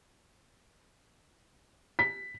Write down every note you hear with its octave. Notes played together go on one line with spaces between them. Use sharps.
B6